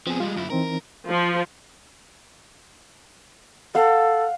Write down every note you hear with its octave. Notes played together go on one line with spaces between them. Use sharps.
F3 B3 C4 G#4
G3 G#3 F4
F#2 E4
E3 C4 D#4 A#4
F3
A4 F5 F#5